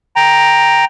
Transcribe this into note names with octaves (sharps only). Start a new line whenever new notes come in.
G5 A#5